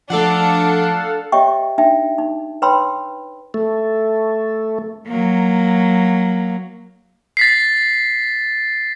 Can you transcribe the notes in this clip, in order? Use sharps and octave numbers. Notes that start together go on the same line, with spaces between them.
F3 A3 D4 A4 F5 F#5
G4 C#5 D#5 E5 G5 C#6
D4 D#4 E5 G5
D#4
B4 C#5 G5 B5 C6 E6
A3
F#3 A#3
A6 B6 C7